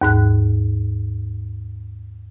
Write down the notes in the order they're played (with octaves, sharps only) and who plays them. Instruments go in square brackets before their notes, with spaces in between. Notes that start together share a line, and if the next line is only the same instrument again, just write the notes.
[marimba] D#2 G#2 F#6